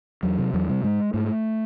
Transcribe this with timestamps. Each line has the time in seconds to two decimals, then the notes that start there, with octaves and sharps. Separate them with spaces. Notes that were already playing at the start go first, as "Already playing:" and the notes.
0.23 E2 F#3
0.38 C3
0.54 E2 F#3
0.69 C3 G3
0.83 G#2 G#3
1.14 G#2 A3